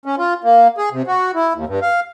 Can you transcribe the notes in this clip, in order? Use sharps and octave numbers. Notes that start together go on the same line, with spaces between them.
C#4
F4
A#3
G#4
C3
F#4
E4
D#2
G2
F5